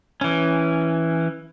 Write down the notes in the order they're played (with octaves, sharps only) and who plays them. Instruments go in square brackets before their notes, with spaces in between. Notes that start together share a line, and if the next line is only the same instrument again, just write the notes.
[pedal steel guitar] E3 C#4